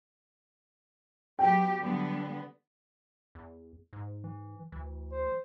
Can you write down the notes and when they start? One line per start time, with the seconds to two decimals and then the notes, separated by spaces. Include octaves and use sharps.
1.39 F#3 B3 G4 G5
1.82 D3 G3 B3
3.35 E2
3.93 G#2
4.24 E3
4.72 D2 E3
5.11 C5